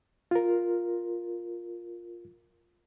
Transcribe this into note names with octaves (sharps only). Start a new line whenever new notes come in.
F4 A#4